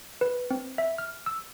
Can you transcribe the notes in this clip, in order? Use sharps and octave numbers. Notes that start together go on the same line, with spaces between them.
B4
C4
E5
F6
E6